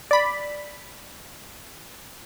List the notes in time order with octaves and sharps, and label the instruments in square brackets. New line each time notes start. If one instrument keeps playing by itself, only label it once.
[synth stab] D5 B5